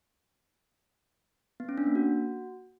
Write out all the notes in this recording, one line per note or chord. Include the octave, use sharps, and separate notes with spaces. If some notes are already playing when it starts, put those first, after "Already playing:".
B3
C#4
D4
A#3
F#4